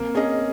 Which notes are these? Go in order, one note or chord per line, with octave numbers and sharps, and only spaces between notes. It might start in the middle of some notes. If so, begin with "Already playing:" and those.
Already playing: A#3 C4
C#4 G#4 D#5